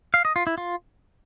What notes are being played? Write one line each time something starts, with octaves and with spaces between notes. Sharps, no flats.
F5
D#5
F4
E4
F4